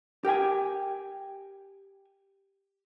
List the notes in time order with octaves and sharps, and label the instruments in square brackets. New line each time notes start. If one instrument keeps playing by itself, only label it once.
[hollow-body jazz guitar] G4 A#4 G5 G#5